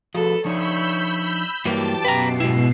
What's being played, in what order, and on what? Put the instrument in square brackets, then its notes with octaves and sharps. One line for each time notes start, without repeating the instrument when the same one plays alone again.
[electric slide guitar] F3 F#4 G#4 [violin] A4 B4
[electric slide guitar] F3 D4 D#4 [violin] C#5 C#6 [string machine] B5 E6 G6
[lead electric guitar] G2 A#3 [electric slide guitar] E3 F#3 [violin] G4 D7 [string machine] A5
[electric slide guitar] F#2 G5 [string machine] B2 C7 [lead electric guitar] B4 A#5
[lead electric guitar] G#2 E4